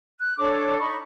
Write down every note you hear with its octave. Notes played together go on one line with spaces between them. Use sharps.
F#6
D4 A4 C#5 D6
D#4 B5 C#6